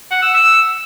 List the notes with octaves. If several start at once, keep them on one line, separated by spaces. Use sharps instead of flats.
F#5
E6
E6